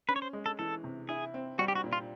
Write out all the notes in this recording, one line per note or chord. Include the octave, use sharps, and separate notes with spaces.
C#4 B4
C#5
C5
G#3
A4
E3 A4
C3
E4 G#4
C4
G3 F#4
G4
F#4
A#2
F4